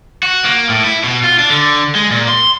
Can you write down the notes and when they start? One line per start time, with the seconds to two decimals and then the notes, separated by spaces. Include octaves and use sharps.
0.23 F#4
0.45 A#3
0.69 A2
0.84 E4
1.04 B2
1.23 F4
1.39 D4
1.50 D3
1.95 G#3
2.11 A#2
2.28 C6